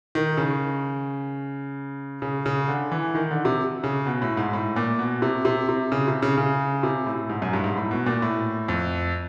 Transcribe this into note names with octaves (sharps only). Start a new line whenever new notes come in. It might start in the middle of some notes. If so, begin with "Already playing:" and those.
D#3
C#3
C#3
C#3
D3
E3
D#3
D3
C3
C#3
B2
A2
G#2
A2
A#2
B2
C3
C3
C3
C#3
C3
C#3
C#3
C3
A2
G#2
F#2
G2
G#2
A2
B2
A#2
A2
F2